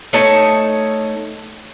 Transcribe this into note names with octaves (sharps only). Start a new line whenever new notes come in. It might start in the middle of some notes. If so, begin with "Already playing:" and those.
A3 D#4 C#5 A5